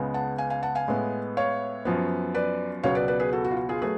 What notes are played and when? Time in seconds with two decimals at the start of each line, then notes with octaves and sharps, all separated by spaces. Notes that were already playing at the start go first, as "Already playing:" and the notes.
Already playing: C#2 C#3 G#3 B3
0.14 F#5 A5
0.38 F5 G#5
0.50 F5 G#5
0.63 F#5 A5
0.75 F5 G#5
0.88 A2 G#3 B3
1.37 C#5 F5
1.85 F#2 F3 B3
2.34 B4 D5
2.83 C#2 B2 F#3 B3 C#5 F5
2.95 B4 D5
3.08 B4 D5
3.20 G#4 B4
3.33 F#4 A4
3.44 F#4
3.51 F4
3.57 F#4
3.69 F4 G#4
3.81 F#3 A3 G#4 B4